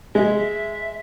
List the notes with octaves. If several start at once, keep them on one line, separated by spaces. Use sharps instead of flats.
G#3 E5